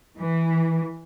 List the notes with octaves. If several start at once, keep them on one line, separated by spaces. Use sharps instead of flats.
E3